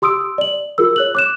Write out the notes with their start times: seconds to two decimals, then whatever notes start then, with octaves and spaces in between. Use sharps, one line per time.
0.02 G4 C6 D#6 E6 D7
0.38 D5 F#7
0.78 F4 G#4 A#4 E6
0.96 C#5 F#6 F#7
1.15 D6 F#6 E7